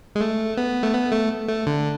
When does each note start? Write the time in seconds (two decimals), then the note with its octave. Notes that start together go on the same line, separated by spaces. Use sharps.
0.15 G#3
0.21 A3
0.57 B3
0.83 A3
0.94 B3
1.12 A3
1.48 A3
1.67 D3